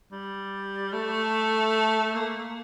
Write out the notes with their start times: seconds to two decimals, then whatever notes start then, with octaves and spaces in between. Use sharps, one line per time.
0.12 G3
0.93 A3
2.15 A#3